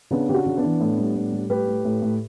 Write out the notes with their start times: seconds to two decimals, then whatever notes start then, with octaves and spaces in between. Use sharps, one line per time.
0.11 C#3 B3 D4
0.29 C#3 G4
0.34 D4 F#4
0.46 C#3
0.57 B3 D4
0.64 E3
0.80 A2
0.98 G3
1.16 A2
1.32 G3
1.50 A2 G4 B4
1.67 A2
1.85 A2
2.02 A2